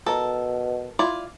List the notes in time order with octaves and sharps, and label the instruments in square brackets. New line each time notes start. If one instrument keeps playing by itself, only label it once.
[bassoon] B2 [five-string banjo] A4 A#4
[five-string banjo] E4 F4 D5